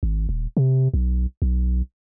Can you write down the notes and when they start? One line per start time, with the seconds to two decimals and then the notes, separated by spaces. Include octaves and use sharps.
0.03 G#1
0.29 D#1
0.57 C3
0.94 B1
1.42 B1